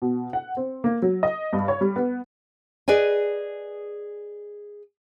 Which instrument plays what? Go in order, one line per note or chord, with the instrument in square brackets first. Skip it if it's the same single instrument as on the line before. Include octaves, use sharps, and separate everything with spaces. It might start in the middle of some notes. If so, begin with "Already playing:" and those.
[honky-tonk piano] B2
F#5
C4
A#3
F#3
D#5
G2
C#5
G3
B3
[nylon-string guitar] G#4 B4 D5 D#5 G#5